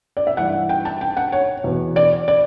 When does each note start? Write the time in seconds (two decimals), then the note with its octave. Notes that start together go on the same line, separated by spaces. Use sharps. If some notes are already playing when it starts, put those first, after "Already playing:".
0.17 D5
0.27 E5
0.37 G2 E3 F#5
0.69 G5
0.85 A5
1.01 G5
1.17 F#5
1.32 C#5
1.64 E2 B2
1.96 D5
2.28 D5